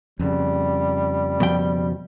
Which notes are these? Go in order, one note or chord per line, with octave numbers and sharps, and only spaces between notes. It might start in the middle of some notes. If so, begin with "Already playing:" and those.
F2 C#3 G3
B2 F3 G5